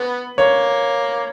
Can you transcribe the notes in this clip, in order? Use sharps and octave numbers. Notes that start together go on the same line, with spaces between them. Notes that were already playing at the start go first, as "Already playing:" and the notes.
Already playing: B3 B4
A#3 C#5